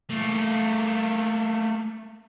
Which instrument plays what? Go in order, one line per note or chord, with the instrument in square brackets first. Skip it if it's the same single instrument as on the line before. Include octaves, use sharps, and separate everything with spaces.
[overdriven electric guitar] A3 A#3